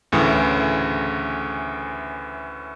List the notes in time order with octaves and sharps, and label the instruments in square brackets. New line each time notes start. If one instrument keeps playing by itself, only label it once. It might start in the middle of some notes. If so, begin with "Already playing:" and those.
[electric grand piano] D2 A2 C#3 E3